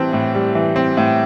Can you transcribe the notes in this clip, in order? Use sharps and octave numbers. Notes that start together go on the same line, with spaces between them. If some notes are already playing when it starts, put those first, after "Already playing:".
Already playing: A2 E3 G3 C4 A5
A2
G3
E3
C4
A2